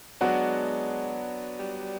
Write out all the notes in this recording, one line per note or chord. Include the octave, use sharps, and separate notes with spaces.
F#3 G#3 B3 D4 F#4
G3